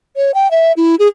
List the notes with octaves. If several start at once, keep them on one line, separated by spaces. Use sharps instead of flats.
C#5
G5
E5
E4
G#4